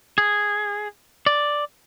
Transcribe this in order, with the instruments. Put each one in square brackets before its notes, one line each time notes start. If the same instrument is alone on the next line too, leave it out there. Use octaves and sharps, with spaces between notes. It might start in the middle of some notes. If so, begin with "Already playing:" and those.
[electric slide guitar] G#4
D5